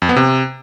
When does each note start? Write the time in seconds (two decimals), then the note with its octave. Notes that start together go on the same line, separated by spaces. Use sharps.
0.02 F2
0.09 B3
0.16 C3